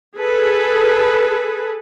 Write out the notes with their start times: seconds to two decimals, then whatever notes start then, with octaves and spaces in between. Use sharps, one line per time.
0.17 G#4 A4 B4